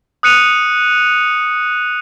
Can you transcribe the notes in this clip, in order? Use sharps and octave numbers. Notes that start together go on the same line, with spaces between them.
D#6 F#6 C#7 D#7 F7